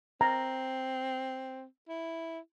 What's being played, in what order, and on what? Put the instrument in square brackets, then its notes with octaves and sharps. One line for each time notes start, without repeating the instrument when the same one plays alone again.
[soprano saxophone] C4 [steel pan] A#5
[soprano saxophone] E4